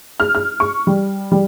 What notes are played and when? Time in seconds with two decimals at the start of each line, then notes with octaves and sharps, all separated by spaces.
0.20 F6
0.35 F6
0.60 C#6
0.87 G3
1.32 G3